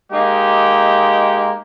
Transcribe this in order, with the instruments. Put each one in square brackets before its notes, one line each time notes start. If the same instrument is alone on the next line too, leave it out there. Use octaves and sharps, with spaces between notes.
[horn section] G#3 A#3 D#4 G4